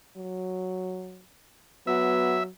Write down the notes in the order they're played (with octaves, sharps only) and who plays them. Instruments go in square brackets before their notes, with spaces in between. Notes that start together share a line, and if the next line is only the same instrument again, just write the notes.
[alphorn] F#3
[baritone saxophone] F#3 [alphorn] B3 [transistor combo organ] E5